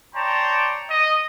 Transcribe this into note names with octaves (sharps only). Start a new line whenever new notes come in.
C#5 D5 G5 A5 A#5 C6
D#5 D#6